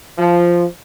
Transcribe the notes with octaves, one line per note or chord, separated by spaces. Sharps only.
F3